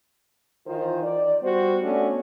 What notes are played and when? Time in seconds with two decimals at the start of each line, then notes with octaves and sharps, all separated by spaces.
0.67 D#3 E3 D#4 F4 C5
1.03 D5
1.41 G3 B3 F#4 C5
1.82 A3 B3 C#4 D4